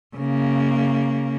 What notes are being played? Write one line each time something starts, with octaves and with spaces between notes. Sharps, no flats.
C#3 A#3